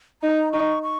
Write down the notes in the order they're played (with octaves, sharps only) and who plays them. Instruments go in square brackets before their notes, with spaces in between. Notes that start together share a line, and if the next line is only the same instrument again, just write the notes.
[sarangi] D#4 [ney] A#5
[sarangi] D#4 [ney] C#6
[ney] C#6